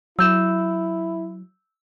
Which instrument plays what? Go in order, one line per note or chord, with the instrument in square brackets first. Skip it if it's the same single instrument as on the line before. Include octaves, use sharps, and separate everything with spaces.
[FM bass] F#3 [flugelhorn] E4 [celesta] E6 G6 E7